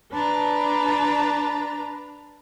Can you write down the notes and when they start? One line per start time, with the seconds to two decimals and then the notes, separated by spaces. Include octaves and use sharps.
0.12 D4 B4 A5 A#5